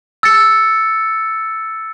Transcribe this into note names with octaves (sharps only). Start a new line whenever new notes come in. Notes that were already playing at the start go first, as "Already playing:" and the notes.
E6 A6 C#7